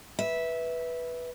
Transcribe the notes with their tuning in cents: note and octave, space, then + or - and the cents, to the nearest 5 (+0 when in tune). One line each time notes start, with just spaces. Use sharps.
B4 -5 E5 -10